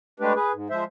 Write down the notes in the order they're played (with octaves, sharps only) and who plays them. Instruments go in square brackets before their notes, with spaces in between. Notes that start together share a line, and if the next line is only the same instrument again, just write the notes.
[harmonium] G#3 A3 D4 G4 B4
G#4 B4
G#2
F3 G#3 C5 E5